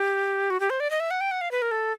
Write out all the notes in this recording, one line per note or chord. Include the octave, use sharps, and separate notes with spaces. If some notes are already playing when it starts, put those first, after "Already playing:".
Already playing: G4
F#4
G4
C5
D5
D#5
E5
F#5
G5
F#5
F5
B4
A#4
A4